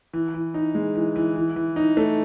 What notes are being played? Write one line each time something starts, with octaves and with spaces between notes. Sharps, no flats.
E3
E3
D#4
G#3
E3
E3
E3
E3
D#4
A3